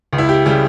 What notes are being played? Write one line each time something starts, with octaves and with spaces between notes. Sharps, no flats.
C#2
E4
G4
C#3 G3 G4